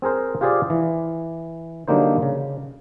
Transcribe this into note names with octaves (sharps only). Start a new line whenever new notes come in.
C4 G#4 A#4 C5
F4 G4 G#4 C5 D5 F5
E3
D3 F#3 G3 A#3 D#4 C5
C#3